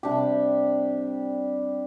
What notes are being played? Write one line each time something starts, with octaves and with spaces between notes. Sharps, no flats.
C3 G3 D4 G4